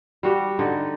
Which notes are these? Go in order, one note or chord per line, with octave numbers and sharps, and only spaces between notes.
G3 F#4 G4
D3 D#4